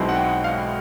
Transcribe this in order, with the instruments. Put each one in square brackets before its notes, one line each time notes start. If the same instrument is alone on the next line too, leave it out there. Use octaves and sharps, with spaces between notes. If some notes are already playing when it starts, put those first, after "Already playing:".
Already playing: [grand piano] B1 B2 G#3 C4 E4
F#5
G5
F5